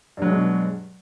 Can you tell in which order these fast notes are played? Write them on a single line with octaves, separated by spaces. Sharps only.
G2 F#3 G#3 B2